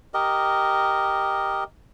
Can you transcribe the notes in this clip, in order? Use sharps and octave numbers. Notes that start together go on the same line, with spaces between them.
G4 A#4 D#5